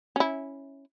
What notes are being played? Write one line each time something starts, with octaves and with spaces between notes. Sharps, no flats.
C#4 E4